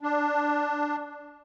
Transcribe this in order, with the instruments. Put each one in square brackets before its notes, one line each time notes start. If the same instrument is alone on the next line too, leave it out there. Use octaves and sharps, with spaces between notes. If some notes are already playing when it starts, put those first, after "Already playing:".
[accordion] D4